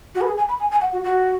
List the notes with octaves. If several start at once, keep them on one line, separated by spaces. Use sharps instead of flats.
F#4
B4
G#4
G#5
B5
G#5
G#5
F#5
F#4
F#4